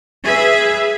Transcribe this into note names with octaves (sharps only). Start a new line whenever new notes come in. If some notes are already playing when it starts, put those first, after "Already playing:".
G#4 B4 E5